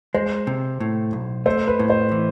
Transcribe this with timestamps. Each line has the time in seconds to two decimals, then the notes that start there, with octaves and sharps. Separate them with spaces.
0.14 G#3 C5
0.47 C3
0.80 A2
1.13 B1
1.46 A3 C5
1.68 B4
1.79 A2
1.90 C5
2.11 E3